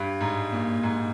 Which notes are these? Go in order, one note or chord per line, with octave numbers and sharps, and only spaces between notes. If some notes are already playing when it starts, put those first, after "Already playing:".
Already playing: G2
G#2
A#2
G#2